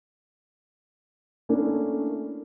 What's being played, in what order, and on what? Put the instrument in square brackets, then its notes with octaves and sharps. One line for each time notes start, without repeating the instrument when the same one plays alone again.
[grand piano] A3 A#3 C#4 D4 E4